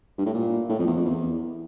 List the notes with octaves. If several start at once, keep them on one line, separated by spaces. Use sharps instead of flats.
G2
A2
A#2
A2
F2
E2
F2
E2